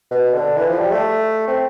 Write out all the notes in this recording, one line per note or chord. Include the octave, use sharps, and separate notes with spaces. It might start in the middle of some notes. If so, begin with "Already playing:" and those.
B2
D3
E3
F3
G3
A3
C4